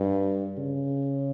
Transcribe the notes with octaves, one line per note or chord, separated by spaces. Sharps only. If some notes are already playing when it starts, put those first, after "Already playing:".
Already playing: G2
C#3